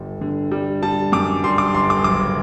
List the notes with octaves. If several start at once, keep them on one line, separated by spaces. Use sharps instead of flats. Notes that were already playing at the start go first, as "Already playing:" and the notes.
Already playing: G1 G3
D3
G3
G3 A5
F#2 D6
G3 C6
D6
G1 C6
D6
F#1 D6